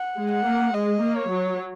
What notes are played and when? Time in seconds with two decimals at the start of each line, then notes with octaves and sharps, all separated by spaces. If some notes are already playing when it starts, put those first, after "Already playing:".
Already playing: F#5
0.17 G#3
0.31 F#5
0.46 A#3
0.74 G#3 D#5
1.01 A#3
1.16 C#5
1.29 F#3